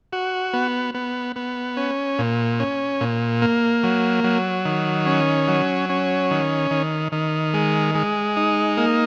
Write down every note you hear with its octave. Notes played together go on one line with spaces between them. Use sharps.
F#4
B3
B3
B3
C#4
A#2
C#4
A#2
A#3
F#3
F#3
D#3
C#4
F#3
C#4
D#3
D#3
D#3
G#3
G#3
D#4
A#3